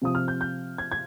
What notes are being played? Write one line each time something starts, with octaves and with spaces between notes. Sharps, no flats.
C3 F3 C4 D#6
F6
G6
G6
G#6
G#6